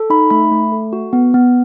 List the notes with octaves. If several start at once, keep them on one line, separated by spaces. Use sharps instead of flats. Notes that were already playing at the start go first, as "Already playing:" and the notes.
Already playing: A4
D#4 B5
A3 B5
A3
A4
F#4
B3
B3